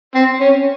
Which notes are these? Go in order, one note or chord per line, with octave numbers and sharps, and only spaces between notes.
C4
C#4